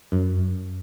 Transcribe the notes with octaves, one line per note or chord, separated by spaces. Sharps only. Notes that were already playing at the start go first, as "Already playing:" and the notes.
F#2